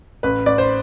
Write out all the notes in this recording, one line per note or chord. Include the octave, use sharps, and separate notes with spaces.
A1 B4
A1 D5
C5